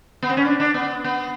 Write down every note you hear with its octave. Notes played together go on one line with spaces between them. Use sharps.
B3
C4
C#4
D4
D4
B3
B3